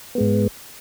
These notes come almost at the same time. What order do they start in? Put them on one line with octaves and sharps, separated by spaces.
B3 G#3 G#2